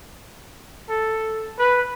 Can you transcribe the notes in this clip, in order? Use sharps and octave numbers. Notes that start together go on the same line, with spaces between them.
A4
B4